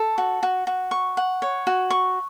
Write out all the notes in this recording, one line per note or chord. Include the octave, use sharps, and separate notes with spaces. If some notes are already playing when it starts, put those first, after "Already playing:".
Already playing: A4
F#4
F#4
F#4
C#6
F#5
C#5
F#4
C#6